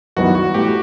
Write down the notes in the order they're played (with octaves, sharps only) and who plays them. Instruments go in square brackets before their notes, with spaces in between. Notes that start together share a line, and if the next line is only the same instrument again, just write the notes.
[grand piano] F#2 D#3 G3 B3 E4 [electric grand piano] F#4
[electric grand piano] F#4
[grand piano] A2 E3 A3 [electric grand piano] G4